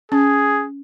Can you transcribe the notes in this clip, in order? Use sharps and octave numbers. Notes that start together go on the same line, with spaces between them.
C#4 G#4